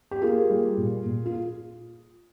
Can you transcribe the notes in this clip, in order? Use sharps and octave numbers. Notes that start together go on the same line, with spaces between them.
G4
A#3 F4 G#4
G3
A#2
A#2
F4